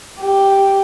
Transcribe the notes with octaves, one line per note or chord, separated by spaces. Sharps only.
G4